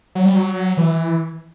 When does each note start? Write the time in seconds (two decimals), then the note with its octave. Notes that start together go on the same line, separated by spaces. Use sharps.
0.15 F#3
0.25 G3
0.35 F#3
0.77 E3